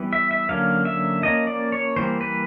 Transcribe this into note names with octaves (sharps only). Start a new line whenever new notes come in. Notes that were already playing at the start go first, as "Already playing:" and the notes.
Already playing: E3 G3 B3
E5
E5
D3 F#3 A#3 C#4 F5
E5
F3 A#3 C#4 D#5
D5
C#5
E3 G3 A#3 C5
B4